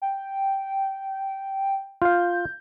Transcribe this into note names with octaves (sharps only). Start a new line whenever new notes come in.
G5
F4 F5 G6